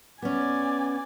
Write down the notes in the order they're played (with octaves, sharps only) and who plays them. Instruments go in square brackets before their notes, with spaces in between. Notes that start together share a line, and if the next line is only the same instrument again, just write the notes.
[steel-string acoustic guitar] B3 C#4 [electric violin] D5 G#5